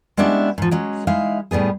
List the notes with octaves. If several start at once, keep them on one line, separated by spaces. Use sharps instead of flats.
G#3 B3 C#4 D4 E4 G4
G#2 F3
F#3 G#3 C#4
G#3 D#4 E4 F5
A2 G3 B3 G#4